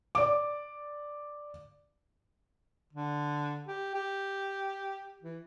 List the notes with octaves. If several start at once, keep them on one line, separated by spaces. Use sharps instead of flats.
D5 D6
D3
G4
G4
E3